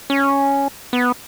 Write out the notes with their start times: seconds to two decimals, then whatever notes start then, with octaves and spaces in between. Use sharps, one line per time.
0.10 C#4
0.93 B3